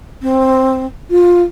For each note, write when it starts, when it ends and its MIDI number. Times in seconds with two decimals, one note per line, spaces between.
0.22 0.86 60
1.10 1.43 65